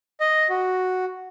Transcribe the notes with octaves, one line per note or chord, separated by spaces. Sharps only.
D#5
F#4